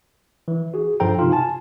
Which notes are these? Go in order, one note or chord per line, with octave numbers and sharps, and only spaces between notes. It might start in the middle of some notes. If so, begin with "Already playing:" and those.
E3
F#4 G#4
G2 F3 A4 C5 G5 A#5
C3 D#4 F4
G#5 A5